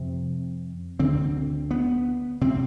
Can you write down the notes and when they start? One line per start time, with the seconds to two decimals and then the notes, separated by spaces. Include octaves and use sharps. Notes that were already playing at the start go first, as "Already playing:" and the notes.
Already playing: F2 C3 C4
0.99 D2 D3 C4
1.71 B3
2.41 C3 C4